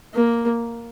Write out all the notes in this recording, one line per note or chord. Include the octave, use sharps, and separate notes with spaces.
A#3